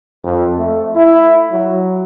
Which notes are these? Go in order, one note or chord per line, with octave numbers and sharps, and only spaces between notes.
F2
A3
E4
F#3